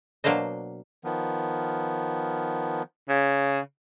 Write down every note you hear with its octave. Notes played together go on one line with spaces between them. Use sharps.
B2 F#3 A#3 D4 C5 D#5
D#3 F3 B3
C#3